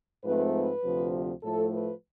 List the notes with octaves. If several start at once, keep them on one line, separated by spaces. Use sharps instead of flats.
G#2 F3 A3 C4 B4
B4
D2 C3 F3
A2 F3 A3 A4
B4